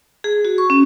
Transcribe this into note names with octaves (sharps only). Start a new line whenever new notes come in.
G#4
F#4
C#6
C#4